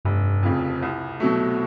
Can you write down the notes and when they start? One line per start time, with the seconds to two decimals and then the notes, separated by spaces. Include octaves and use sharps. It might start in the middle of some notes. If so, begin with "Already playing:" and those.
0.05 F1 G2
0.43 F2 C#3 F3
0.82 C2
1.20 B2 F#3 A3